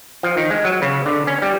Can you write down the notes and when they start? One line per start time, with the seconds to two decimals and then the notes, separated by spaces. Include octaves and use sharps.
0.23 F3
0.37 D#3
0.51 G#3
0.65 F#3
0.82 C#3
1.06 D3
1.27 C#4
1.42 G3